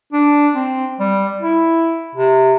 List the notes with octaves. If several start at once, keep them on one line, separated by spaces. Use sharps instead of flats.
D4
C4
G3
E4
C3